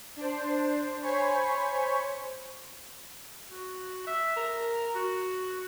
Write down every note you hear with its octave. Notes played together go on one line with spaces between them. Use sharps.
D4 C5
C5 C#5 G#5 B5 C#6
F#4
E5
A#4
F#4